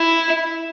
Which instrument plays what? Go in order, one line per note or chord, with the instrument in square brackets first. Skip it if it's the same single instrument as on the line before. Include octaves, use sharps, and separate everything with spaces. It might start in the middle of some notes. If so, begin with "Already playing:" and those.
Already playing: [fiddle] E4